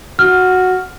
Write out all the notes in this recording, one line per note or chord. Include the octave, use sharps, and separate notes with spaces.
F#4 F6